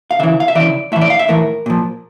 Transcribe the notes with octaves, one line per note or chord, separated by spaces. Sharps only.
F5
C#3 E3 E5
F5
E5
C#3 E3 D5
A2 E3 E5
D5
F5
E5
A2 E3 A#4
A#2 F3